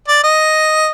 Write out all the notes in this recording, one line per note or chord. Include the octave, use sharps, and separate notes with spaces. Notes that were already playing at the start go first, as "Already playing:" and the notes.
D5
D#5